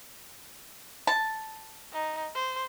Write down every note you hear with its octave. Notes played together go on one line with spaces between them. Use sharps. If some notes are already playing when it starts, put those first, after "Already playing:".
A5
D#4
C5